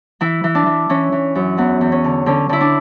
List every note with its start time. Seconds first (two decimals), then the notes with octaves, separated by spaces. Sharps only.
0.21 E3 E4
0.44 E3
0.55 D4
0.66 E3
0.89 E3 C#4
1.12 E3
1.35 F#2
1.58 E2 B3
1.81 E2
1.92 C#4
2.04 D3
2.26 D3 C#4
2.49 D3 E4
2.61 D4